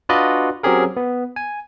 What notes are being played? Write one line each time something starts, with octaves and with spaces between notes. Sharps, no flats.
D4 F4 F#4 B4 D5 D#5
F#3 C4 C#4 G4 G#4 A#4
B3
G#5